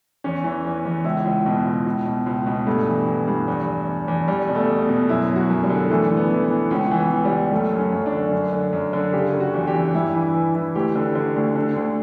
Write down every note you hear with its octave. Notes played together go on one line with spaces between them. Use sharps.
E2 C#4
E3
E2
E2
C#2 E4
C#2
B2
C#2
C#2
B2
C#2
B2
G2 A3
E3
E3
G2
E2
E2
E2
E2
E2 G3
B2
A3
B2
B2
F#2 E4
F#2
F#4
F#2
G3
D3
E3 A3
E3
B3
E3
B3
E3
C#2 C#4
E3
B3
E3
G3
C#2
F#2 A3
F#2
C#4
F#2
D4
D3
F#2
D3
F#2
D3
C#3 G4
C#3
F#4
E2
G4
E3
G2 E4
E3
E3
E3
D2 G4
D3
D3
D2
D3
D2